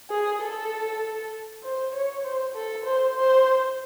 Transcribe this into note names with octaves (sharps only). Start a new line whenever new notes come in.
G#4
A4
C5
C#5
C5
A4
C5
C5